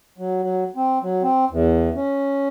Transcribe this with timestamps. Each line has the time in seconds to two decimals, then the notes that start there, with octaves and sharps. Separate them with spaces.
0.18 F#3
0.43 F#3
0.76 C4
1.02 F#3
1.22 C4
1.51 E2
1.95 C#4